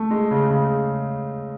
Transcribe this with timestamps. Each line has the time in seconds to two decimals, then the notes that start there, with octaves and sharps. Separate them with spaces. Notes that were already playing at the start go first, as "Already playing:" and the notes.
Already playing: A3
0.11 G#3
0.31 C#3
0.50 C#3